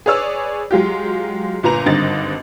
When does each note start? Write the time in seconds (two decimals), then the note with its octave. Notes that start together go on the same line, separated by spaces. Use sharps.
0.06 G#4 B4 C#5 D5 E6
0.71 F#3 G#3 F4 G4
1.63 G1 A#2 B4 A#5 F7
1.86 G#1 G2 D3 C4 D#5 A6